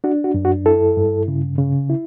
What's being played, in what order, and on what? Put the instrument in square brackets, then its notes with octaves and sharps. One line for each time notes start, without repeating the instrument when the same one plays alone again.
[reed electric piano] D4 F#4
F#4
F#2
F#4
E4 A4
G2
C#3
C#3
E4